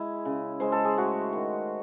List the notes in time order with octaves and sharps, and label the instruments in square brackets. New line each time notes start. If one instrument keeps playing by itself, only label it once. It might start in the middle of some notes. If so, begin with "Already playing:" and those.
Already playing: [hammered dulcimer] G#3 E4
C#3
G#3 C5
A4
G#4
A3 F#4
D#3